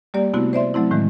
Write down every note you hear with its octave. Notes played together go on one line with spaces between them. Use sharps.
G3 A#3 G4 D5
C3 A3 B3 C4 E4 F#4
C5 D5 E5 C6
F#3 A3 C4 E4
A2 D#3 E3 G#3